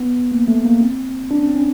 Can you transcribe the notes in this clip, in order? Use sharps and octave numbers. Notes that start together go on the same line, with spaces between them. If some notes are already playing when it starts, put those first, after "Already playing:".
Already playing: B3
A#3
A3
A#3
C4
D4
C#4
C4
C#4